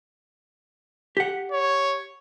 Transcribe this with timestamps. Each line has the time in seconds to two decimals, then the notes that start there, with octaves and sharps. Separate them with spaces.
1.17 G4 F#5
1.52 C#5